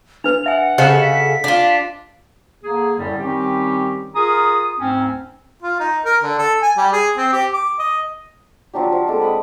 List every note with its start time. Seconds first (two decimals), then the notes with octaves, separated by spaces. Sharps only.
0.24 D4 B4 F7
0.46 E5 F#5 G#5
0.78 C#3 F#4 G4 A4 C5 D#5
1.02 B6
1.44 D4 F4
2.64 D3 A#3 G#4
2.98 F#2 A2 D3 G3
3.19 D#3 G3 C4 C#4 D#4 G4
4.15 F4 G#4 A#4 A#5 D#6
4.80 D2 G#2 C4 C#4
5.63 F4
5.80 D#4
6.05 A#4
6.23 D3
6.39 A4
6.62 G#5
6.77 G3
6.93 G#4
7.18 C4
7.33 G4
7.53 D6
7.79 D#5
8.74 F3 F#3 D4 G4
8.92 F3
9.08 G#3 C4 A4 D6
9.20 F#5 B5 D#6